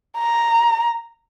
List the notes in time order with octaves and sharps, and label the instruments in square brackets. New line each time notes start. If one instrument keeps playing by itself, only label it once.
[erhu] A#5